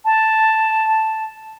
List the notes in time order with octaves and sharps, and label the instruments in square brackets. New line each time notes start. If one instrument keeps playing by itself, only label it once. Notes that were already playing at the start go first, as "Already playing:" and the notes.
[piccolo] A5